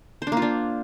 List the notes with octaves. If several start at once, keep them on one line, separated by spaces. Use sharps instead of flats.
C5
D4
A#3
F4
D4